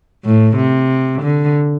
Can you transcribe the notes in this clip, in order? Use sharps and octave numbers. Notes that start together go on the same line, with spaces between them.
A2
C3
D3